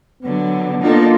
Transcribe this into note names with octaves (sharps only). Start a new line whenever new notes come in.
D3 F#3 B3
A#3 D4 D#4 F4 A4